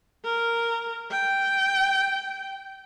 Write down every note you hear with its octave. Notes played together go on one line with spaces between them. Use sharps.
A#4
G5